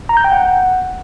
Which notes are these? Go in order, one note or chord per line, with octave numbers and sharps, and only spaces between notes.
A#5
G6
G5
F#5